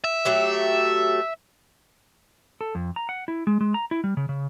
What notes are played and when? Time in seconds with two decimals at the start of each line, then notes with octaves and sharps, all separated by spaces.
0.04 E5
0.25 F#3 A3 G4
2.61 A4
2.75 F2
2.96 A#5
3.09 F#5
3.28 E4
3.47 G#3
3.61 G#3
3.74 A#5
3.91 E4
4.04 G3
4.17 C#3
4.29 C#3